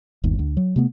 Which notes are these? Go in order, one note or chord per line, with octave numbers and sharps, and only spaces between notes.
G1 D#2
D2
F#3
C3 A3 B3